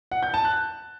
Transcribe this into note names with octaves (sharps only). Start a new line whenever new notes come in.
F#5
G6
A5
F#6